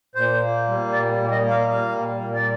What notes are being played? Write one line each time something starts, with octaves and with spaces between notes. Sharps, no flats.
A#2 C5
A#3
G3
A#2 D5
A#2
D#5
A#3
F5
G3 F5
A#2
A#2
D5